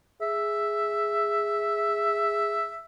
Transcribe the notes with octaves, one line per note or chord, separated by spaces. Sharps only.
G#4 E5